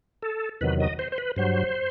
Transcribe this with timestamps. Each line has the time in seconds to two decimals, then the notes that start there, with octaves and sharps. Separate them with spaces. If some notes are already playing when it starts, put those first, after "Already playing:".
0.22 A4
0.61 E2 C3 D#3 F#3 B4
0.80 D#5
0.99 C5
1.12 C5
1.18 B4
1.36 G2 F#3 C5